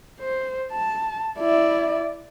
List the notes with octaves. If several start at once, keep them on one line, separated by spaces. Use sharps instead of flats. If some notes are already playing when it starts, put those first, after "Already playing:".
C5
A5
E4 D5